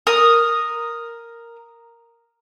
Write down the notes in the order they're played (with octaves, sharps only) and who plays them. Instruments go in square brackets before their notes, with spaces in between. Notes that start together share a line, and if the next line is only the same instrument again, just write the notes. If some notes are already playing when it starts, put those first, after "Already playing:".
[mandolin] A#4 D#6